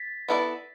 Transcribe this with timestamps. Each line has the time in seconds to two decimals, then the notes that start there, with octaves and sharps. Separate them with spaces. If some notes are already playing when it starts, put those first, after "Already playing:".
Already playing: A6 B6
0.28 B3 E4 A4 D5